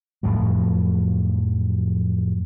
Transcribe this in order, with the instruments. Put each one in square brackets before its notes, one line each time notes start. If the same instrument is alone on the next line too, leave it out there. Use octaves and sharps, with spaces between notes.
[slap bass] F2 A2 F3 F#3